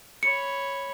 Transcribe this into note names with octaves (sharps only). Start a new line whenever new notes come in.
C#5 B5 C#7